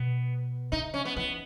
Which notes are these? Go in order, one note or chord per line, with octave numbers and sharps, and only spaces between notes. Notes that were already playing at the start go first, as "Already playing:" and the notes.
Already playing: B2 B3
C#3 D#4
C#4
B3
E3 B3